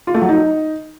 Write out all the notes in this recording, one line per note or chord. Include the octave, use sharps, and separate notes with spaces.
F4
A3
F#3
D#4